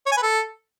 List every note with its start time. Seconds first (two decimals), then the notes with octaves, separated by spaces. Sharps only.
0.06 C#5
0.12 G#5
0.17 B4
0.22 A4